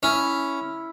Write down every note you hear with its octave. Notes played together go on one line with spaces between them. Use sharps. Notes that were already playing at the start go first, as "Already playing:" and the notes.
C#4 E4